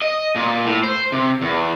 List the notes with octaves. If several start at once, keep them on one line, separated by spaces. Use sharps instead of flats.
D#5
A#2
A2
C5
C3
E2